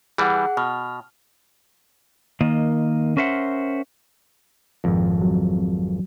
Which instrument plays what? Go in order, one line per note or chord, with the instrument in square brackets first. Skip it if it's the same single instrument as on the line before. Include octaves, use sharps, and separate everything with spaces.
[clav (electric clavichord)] E3 G3 [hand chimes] G#4 F#5
[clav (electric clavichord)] B2 [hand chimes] F6
[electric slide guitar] D#3 A#3 D#5
C#4 A#4 C5 E5 F#5
[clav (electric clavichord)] G#1 F2
[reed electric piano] F#3